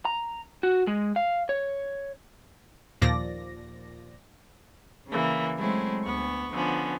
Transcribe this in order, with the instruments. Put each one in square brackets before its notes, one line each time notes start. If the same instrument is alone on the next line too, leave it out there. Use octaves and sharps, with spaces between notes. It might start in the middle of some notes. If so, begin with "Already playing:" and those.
[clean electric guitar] A#5
F#4
G#3
F5
C#5
[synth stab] D#2 A#2 F3 D5 A#6
[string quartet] C#3 E3 A#3
F#3 G#3 A3 C4 E4
D2 B3 C#6
D3 F3 B3 C#4